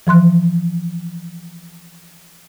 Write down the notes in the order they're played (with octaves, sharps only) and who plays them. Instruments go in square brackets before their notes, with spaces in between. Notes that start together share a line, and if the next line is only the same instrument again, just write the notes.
[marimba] E3 F3 C6 F#6